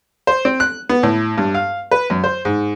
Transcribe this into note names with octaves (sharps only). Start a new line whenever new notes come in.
C5
C4
F#6
B3
A2
G2
F5
B4
F#2
C5
G#2